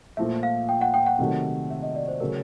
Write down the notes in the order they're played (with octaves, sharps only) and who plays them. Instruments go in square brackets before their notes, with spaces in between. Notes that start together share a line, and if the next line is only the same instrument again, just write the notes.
[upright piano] A#2 F3 A3 [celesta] E5
[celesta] F5
G5
F#5
G5
F#5
[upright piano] C3 D#3 F#3 A3
[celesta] E5
D#5
D5
C5
[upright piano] C#3 F#3 A3 [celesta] A#4